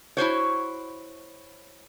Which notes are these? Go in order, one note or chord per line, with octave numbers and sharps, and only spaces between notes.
E4 F#4 C5 C#5